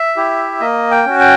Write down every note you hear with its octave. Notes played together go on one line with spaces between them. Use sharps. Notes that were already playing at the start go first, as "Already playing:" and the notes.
Already playing: E5
E4 G4
A#3 D#5
G5
C#4 F#4
G5